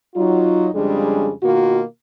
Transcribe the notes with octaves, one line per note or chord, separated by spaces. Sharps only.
F#3 D#4 F4
F2 C#3 G3 G#3 D4 G#4
B2 D#3 A#3 F4 F#4